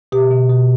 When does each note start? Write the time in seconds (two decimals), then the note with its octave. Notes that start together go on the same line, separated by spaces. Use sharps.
0.12 B2 G4
0.31 B2
0.49 B2